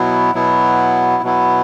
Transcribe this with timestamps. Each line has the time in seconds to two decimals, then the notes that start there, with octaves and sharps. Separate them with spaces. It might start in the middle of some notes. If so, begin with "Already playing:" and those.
Already playing: B2 F#3 B3 E4
0.34 B2 F#3 B3 E4
1.23 B2 F#3 B3 E4